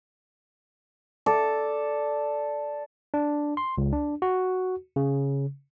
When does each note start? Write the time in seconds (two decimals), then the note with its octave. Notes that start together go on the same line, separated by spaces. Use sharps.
1.26 A4 D5
3.14 D4
3.57 C6
3.78 C#2
3.93 D4
4.22 F#4
4.96 C#3